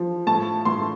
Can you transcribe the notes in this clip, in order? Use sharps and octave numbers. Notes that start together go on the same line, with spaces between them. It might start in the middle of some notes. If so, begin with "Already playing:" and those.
Already playing: F3
A2 A5
A2 C6